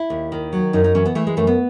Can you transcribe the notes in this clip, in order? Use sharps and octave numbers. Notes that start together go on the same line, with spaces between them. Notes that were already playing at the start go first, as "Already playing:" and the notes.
Already playing: E4
D#2
D#3
F#3
F#2 D#4
D#4
E3 C#4
B3
E3 A3
G#3
F#2 A3
B3